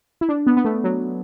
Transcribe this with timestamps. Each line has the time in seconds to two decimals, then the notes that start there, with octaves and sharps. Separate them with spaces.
0.21 E4
0.29 D4
0.47 B3
0.57 B3
0.65 A3
0.84 F#3